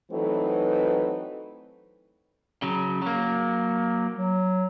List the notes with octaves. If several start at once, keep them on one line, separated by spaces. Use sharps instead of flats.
E3 F#3 A3 C4 D#4 B4
C#3 F#3
F#3 A#3
F#3